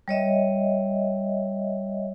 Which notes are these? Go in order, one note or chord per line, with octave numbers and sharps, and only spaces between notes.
G3 C#5 D#5 E5